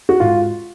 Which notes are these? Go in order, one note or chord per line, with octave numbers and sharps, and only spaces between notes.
F#4
G#2 F4